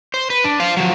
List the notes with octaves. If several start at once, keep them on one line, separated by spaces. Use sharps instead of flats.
C5
B4
D4
C5 F5
F3 F#3